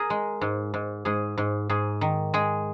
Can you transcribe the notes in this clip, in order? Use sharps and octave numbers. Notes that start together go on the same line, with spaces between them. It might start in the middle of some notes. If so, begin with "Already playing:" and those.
Already playing: G#4 A#4
G#3
G#2
G#2
G#2 G#4
G#2
G#2 G#4
D#3
G#3 G#4